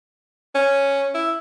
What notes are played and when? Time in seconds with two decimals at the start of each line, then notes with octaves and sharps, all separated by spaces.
0.55 C#4
1.14 E4